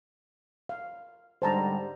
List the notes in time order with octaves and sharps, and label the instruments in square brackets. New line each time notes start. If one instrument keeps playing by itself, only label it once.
[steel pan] F5
[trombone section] G#2 D3 G3 [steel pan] C5 A5 A#5